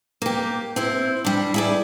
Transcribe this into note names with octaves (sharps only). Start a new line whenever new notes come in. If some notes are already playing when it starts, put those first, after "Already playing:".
A#3 G4
C4 E4 C5
G3 D4
E4 G#4 D5